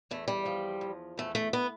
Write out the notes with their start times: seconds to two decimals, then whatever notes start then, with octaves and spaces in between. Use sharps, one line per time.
0.11 E2 A3
0.28 G3
0.46 F3
0.81 E2
1.18 E2 A3
1.35 A3
1.53 B3